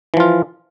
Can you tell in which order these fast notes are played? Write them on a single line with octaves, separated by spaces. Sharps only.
E3 F3 F4